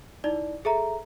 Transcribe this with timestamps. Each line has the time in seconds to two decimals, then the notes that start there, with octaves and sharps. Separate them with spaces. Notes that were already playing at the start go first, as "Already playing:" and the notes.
0.24 D#4 E4 D5
0.65 G#4 A4 E5 A#5